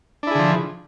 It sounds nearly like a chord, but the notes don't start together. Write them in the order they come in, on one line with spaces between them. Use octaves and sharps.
D4 E4 G#4 D3 F3